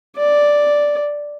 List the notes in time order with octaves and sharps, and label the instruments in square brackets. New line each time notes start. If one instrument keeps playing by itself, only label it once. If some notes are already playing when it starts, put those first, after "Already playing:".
[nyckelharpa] D5